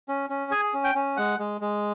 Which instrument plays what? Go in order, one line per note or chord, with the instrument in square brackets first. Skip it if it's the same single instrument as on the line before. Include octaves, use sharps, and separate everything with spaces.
[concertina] C#4
C#4
G#4 G#5
C#4
G5
C#4
G#3 F#5
G#3
G#3